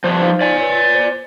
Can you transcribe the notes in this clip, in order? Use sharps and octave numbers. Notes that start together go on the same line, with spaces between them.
F3 G3 B4 C5
D#4 C5 F5
D5 G#5
B4 C#5
C5